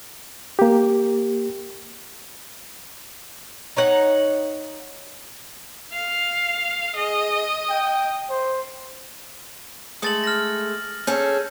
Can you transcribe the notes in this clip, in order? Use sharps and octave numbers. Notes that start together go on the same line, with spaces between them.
A#3 G4
D#4 C#5 F#5
F5
G#4 D#5
G5
C5
G#3 A3 A4 D#6 A6 F#7
F6 A#6
C#4 G#4 A4 G6